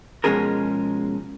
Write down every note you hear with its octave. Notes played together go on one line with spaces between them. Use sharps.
B2 F3 G#3 C#4 G#4 A#4